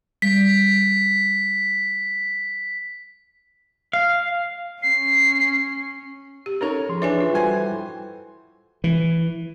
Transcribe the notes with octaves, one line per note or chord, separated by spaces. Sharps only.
G3 B6
F5
C#4 C7
G4
C#4 D#4 A4 A#4 C#5
F3 G#4 C6
E3 D4 C#5 E5 G#5
F4
G3 F#4 A4 C5 G5 G#5
E3